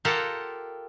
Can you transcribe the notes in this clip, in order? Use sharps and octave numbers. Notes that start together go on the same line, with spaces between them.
F4 G4 A4 A#4 F5 F#5